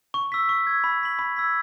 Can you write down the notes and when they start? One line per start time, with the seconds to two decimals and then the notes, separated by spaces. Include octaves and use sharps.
0.14 C#6
0.32 E6 B6
0.49 C#6
0.67 E6 G#6
0.84 B5
1.01 E6 B6 F#7
1.19 B5
1.36 E6 G#6 B6